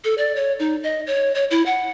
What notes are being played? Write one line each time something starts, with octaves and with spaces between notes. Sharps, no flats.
A4
D5
C#5
D#4
D#5
C#5
C#5
E4
F#5